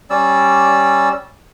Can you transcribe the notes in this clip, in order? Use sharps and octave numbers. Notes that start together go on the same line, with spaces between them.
G3 C#4 D5 E6